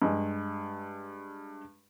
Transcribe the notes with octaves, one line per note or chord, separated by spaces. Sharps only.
G2 G#3